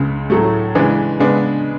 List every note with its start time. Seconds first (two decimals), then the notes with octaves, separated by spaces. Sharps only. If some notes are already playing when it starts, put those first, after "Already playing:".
Already playing: C#2 C#3 G#3
0.30 A2 F#3 A3
0.75 C#3 E3 G#3 D4
1.20 C#3 G#3 B3 D4